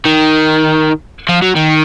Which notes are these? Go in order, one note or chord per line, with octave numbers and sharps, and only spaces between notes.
D#3
F3
F#3
D#3